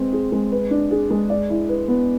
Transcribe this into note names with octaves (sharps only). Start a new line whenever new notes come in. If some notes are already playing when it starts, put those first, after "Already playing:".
Already playing: G#3 C4 B4
G#4
G#3
B4
D4
G#4
G#3
D5
E4
B4
B3